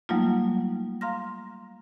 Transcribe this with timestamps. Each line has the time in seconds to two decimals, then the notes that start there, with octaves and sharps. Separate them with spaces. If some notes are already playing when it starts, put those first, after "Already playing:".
0.09 F#3 G3 A3 A#3 D#4 F4
1.01 F5 A#5 C6 F6 A#6